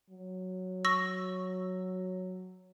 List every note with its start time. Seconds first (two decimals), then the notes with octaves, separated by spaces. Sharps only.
0.10 F#3
0.85 C#6 E6 A#6